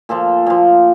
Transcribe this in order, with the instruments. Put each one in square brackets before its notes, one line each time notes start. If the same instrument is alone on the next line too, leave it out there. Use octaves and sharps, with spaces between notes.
[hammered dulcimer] A#2 F3 A4
A#2 F3